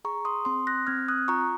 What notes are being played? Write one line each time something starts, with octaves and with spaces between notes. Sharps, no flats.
G#4 A#5 C#6
C6 D#6
C4 C6 D#6
F#6 A#6
C4 F6 G#6
D#6 F#6
F4 A#5 C#6